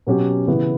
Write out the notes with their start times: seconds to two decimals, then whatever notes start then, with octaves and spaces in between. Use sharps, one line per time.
0.07 B2 F#3 C#4 G4
0.47 C#3 E3 B3 E4